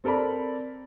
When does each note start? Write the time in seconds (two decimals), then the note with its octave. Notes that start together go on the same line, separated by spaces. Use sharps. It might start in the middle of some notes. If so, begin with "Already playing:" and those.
0.04 C4 A4 A#4 D5 B5